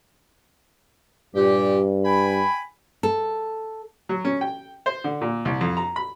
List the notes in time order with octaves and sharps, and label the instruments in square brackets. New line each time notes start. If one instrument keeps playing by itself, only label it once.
[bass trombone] G2 [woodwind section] A#2 G4
[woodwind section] G5 G#5 B5
[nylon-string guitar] A4
[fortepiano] F#3
C#4
G5
C5
D3
A#2
C2
F2
A#5
B5